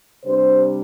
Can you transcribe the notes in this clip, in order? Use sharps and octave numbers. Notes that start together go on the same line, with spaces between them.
C3 G3 D4 C5